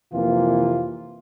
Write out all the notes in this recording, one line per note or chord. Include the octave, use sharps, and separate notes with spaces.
F2 C3 E3 A#3 F4